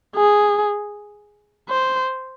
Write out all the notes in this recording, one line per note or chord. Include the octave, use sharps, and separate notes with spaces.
G#4
C5